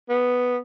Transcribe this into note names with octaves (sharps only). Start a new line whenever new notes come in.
B3